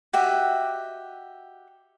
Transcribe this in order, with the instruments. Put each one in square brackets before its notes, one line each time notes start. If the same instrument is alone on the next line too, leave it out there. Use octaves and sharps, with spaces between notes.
[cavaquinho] F#4 G4 D#5 E5